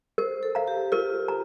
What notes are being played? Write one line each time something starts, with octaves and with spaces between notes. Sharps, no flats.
A#4 C5
A4
F5 A#5
G4
F4 A#4
A#5